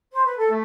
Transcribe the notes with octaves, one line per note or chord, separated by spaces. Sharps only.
C5
B4
A4
A3